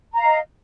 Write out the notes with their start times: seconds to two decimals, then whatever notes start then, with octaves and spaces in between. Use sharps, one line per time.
0.13 A#5
0.18 F5
0.23 D#5